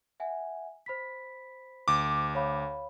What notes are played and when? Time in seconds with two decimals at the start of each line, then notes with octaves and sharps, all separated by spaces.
0.20 E5 F#5 G#5
0.86 C5 B5 B6
1.88 D2 D6
2.35 C#5 F5 B5